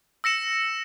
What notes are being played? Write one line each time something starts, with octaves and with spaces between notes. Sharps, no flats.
E6 A#6 C#7 E7